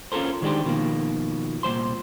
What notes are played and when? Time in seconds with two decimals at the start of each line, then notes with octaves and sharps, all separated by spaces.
0.12 C#4 F4 G4 A4 A#4 C5
0.42 D#3 G#3 D4 D#4 G4 C5
0.65 B2 D#3 F3 G#3 A#3
1.63 C2 A#2 E3 C5 C6